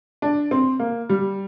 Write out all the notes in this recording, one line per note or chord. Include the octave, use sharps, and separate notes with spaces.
D4
C4
A#3
G3